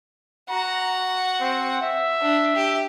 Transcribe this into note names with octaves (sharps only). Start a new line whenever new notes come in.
F#4 F#5 A#5
C4
E5
D4
G4